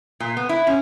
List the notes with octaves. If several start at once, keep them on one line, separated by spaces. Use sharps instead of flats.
A#2
B3
E4
C#4